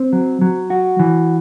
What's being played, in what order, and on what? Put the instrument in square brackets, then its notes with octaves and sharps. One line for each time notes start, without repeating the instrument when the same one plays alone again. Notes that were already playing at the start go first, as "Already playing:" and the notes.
Already playing: [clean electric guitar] C4
F#3
F#3
F#4
E3